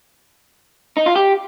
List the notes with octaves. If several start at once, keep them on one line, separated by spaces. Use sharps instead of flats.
D#4
F4
G4